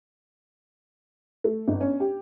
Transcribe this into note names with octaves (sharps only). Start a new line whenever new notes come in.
A3
G1
C#4
G4